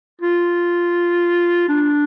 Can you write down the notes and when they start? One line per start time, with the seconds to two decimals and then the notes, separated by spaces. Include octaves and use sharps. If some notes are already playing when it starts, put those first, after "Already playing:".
0.21 F4
1.69 D4